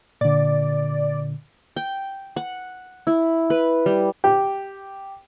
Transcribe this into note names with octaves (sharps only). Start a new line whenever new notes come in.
A#2 D3 D5
G5
F#5
E4
B4
G3
G4